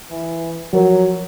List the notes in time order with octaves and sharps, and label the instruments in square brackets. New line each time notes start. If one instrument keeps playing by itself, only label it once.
[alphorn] E3
[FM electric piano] F3 A#4 C#5 [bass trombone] F#3 [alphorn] F#4